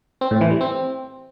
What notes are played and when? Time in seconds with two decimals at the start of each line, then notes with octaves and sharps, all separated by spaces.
0.21 C4
0.31 A2
0.41 E3
0.51 G3
0.61 C4